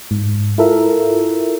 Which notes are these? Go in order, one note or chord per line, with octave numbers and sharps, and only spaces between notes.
G#2
E4 F4 A4 A#4 E5